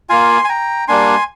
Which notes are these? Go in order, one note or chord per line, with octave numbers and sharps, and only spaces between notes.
A#3 F4 G#5 C6
G#5
G5 A#5
G3 A#3 D4 G#5 C6